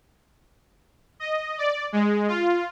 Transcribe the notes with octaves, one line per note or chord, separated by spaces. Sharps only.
D#5
D5
G#3
F4